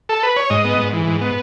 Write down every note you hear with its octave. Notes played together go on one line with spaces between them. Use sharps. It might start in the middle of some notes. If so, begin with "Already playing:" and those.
A4
B4
C#5
G#2 D#5
B3
G#2
E3
G#2
B3